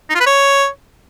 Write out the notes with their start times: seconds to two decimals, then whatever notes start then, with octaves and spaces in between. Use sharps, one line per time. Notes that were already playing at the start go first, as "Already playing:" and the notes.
0.09 D#4
0.15 F4
0.21 B4
0.26 C#5